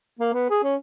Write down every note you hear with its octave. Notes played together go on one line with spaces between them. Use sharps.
A#3
B3
G#4
C#4